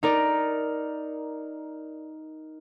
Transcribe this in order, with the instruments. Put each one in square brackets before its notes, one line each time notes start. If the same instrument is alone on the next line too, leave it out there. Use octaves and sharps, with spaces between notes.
[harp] D#4 A#4 D5